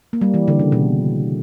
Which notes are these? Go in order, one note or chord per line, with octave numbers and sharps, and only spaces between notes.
A#3
G3
E3
D3
C#3
B2